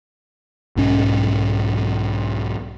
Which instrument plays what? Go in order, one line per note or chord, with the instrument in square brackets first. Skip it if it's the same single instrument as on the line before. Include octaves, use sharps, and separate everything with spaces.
[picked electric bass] B1 G#2 C#4